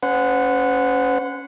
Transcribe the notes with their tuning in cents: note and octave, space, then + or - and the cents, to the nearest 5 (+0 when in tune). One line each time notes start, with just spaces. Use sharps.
C#4 +0 C5 -45 F#5 -10